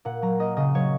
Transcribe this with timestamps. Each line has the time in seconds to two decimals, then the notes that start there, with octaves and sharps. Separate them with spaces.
0.05 A#2 F#5
0.22 F#3 A#5
0.39 A#3 D#5
0.57 C#3 D#5
0.74 F#3 C#5